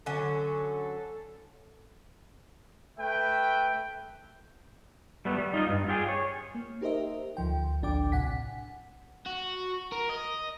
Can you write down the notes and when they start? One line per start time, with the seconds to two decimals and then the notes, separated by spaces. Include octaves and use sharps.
0.06 D3 F#3 C#4 A4
2.98 A3 B4 E5 G5
5.25 G3 A3 B3
5.38 G3
5.54 D#4 F4 D#5
5.69 G2
5.88 F4 G4 G#4
6.09 C#5
6.55 A#3
6.81 D#4 G4 A#4 C5 D#5 E5
7.37 D2 F3 G5
7.82 A1 D2 D4 G5 D6
8.12 B1 A2 C3 F#5 G#5 B6
8.27 F#5
9.26 F#4
9.92 A#4
10.10 D#5